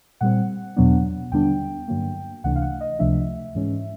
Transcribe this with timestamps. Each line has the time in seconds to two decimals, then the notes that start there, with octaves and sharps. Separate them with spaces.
0.21 A#2 G3 C4 F#5
0.76 E2 B2 F#3 B3 D4
1.31 D#2 D3 G3 B3 D4 G5
1.88 G2 D3 F#3 A#3
2.44 C#2 C3 E3 A3 D4 F#5
2.56 F5
2.62 F#5
2.81 D#5
2.99 C#2 C3 F3 A3 D4 E5
3.55 G#2 E3 G#3 C#4